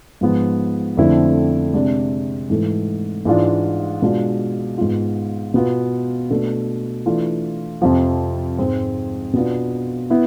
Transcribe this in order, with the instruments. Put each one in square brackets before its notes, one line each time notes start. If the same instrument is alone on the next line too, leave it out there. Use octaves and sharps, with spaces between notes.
[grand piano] G#2 F3 G#3 B3
F2 D3 A3 C4 E4
C3 G#3 D4
G#2 E3 A3
G#2 E3 G#3 D4 F4
B2 G#3 D4 F4
G#2 G#3 B3 F4
B2 B3 F4
B2 A3 D4
E3 A3 D4 F4
F2 C3 F3
G#2 G#3 C4
B2 B3 D4 F4
B3 E4